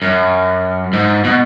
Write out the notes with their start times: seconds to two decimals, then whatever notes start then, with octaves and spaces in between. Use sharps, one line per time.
0.02 F#2
0.93 G#2
1.24 B2